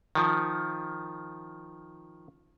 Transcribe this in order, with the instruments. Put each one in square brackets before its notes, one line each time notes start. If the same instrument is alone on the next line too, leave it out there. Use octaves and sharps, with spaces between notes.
[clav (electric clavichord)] D#3 F3